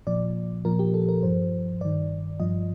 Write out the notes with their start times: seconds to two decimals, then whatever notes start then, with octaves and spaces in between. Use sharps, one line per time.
0.07 A#2 F3 D5
0.65 A#2 F3 A#4
0.79 G4
0.94 A4
1.09 A#4
1.23 G2 F3 C5
1.81 G2 D#3 D5
2.40 G2 F3 D#5